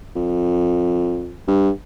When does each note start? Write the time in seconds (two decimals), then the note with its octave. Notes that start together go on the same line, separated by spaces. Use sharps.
0.16 F2
1.48 G2